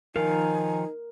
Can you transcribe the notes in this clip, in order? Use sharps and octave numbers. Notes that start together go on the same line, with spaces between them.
D#3 F3 D#4 A#4 F5 G#5